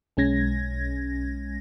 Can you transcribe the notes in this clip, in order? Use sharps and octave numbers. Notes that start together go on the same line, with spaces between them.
B1 G#3 C#4 G#6 A#6